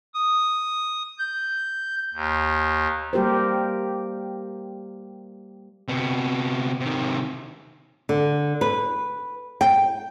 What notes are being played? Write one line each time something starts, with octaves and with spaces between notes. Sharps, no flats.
D#6
G6
D#2
G3 A#3 G4 A#4 C5
C3 B3
C3 D#3
D3
B4
G5